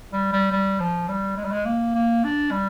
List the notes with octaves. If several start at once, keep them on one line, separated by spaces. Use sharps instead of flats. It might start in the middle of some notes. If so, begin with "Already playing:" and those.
G3
G3
G3
F3
G3
G#3
G3
G#3
A#3
A#3
D4
G3